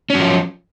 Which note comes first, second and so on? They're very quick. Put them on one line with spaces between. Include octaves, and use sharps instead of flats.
C#4 F#3 F3